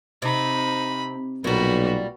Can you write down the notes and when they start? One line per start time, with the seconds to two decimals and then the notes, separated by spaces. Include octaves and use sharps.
0.22 C3 D#4 B5
1.44 B1 A#2 G3 F#4 B4